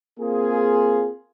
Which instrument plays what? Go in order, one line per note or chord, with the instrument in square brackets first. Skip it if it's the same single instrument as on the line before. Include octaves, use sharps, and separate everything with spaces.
[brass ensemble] A#3 C4 F4 G#4